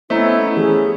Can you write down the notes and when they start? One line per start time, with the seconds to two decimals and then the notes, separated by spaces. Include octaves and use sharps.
0.10 A3 B3 C#4 E4 C5 D#5 A#5
0.57 E3 C#4 G4 G#4